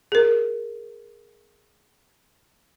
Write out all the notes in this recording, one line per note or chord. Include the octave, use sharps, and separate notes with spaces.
G#4 A#4